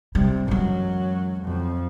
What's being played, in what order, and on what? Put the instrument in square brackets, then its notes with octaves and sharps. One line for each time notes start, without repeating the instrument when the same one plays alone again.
[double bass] C3 [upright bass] G3
[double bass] F#2 F#3 [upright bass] E3 G#3
[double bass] F2